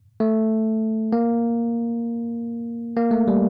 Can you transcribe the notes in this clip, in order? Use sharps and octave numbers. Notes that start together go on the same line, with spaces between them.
A3
A#3
A#3
A3
G3